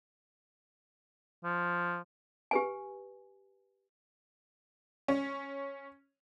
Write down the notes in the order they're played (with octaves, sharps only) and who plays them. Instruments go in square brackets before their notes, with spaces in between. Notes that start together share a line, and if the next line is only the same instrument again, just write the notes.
[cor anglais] F3
[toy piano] G4 B4 G#5
[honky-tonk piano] C#4